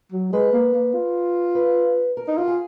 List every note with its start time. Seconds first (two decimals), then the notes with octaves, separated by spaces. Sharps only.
0.12 F#3
0.32 G#3 B4
0.53 A#3
0.74 A#3
0.94 F4
1.55 B4
2.17 A#4
2.28 D#4
2.38 F4 F#4
2.48 G#4